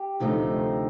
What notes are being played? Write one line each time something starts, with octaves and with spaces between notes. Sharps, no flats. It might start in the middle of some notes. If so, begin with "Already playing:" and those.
Already playing: G4
D2 C3 F3 A3 D#4